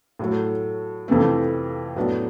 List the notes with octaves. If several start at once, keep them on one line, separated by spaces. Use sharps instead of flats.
A2 F#3 A3
F2 C3 E3 A3
A2 F#3 B3 D4